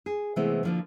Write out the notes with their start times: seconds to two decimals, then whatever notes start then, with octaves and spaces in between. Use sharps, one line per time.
0.06 G#4
0.36 C3 E3 G#3 A3 B3 C4
0.63 D3 F3 A#3